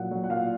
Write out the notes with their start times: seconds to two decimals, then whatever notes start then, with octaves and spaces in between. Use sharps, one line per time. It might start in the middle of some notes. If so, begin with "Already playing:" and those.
Already playing: A#2 F#3 F#5
0.11 F#3
0.24 F#5
0.30 A#2 F5